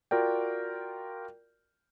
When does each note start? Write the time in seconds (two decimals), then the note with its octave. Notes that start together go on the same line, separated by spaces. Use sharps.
0.11 F4 F#4 A#4 D5 G5